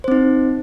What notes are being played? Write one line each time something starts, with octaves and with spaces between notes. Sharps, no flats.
C4 D#4 C5